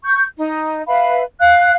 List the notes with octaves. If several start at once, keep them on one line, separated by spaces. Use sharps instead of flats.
C#6 G6
D#4
B4 E5 F5 B5
F5 F#6